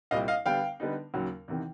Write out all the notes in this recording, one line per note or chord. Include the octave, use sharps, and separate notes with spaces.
C2 A#2 G3 C4 D#5 F5
D#5 F5
D3 G3 B3 F5 G5
D3 G3 B3 D#4
D#2 C#3 F#3
E2 C3 D#3